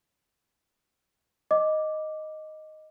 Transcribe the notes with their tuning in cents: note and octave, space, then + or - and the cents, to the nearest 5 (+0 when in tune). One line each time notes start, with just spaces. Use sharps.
D#5 +0 D6 +0